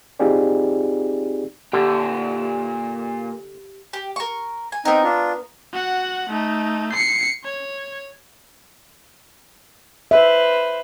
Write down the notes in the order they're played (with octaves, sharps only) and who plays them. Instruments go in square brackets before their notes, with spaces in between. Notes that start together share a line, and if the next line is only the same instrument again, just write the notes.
[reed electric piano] C4 D#4 F4 G4 G#4 D5
[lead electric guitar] A#2 G5 [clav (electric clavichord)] D3 [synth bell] G4
[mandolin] G4
A#4 C#6
G#5
[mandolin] B3 A#4 [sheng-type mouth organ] C4 D#4
[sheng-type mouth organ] D4 F4
[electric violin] F#4 F#5
A3 D#4
C7 C#7
C#5
[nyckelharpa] B4 C5 [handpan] E5